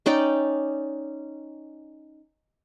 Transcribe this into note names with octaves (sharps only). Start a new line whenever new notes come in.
C#4 D#4 D5 G5